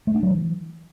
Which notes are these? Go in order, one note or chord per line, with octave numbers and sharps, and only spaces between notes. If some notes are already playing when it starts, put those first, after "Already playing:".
A3
D4
F#3
E3